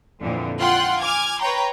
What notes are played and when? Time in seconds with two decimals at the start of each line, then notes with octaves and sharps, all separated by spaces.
0.22 F2 A#2 D3 E3
0.60 F4 F#5 G5 C6 F#6
1.02 G#5 D6 F6 G#6
1.41 B4 C#5 G5 A#5 C6